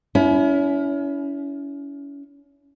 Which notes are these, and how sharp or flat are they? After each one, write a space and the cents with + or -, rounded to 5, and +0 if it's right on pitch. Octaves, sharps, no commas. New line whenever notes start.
C#4 +35 E4 +0